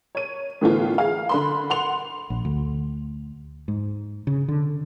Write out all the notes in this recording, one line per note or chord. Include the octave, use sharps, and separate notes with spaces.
C#5 D#7
A2 D3 E3 A3 B3 F4
G#4 F5
D3 B5 C6
F#5 C6 F7
A#1
D2
G#2
C#3
D3